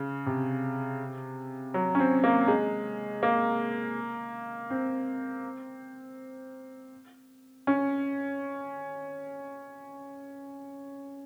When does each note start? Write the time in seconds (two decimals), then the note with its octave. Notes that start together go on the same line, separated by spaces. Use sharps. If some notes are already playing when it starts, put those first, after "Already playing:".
Already playing: C#3
0.26 C3
1.74 F#3
1.95 C#4
1.99 C4
2.24 A#3
2.48 G#3
3.23 A#3
4.70 C4
7.67 C#4